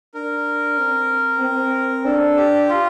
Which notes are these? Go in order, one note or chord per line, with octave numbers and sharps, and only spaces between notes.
D4 A#4
C4
C4
D4 A4
G4
F4